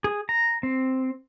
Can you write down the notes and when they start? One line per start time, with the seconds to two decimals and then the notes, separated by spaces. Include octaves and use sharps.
0.04 G#4
0.29 A#5
0.63 C4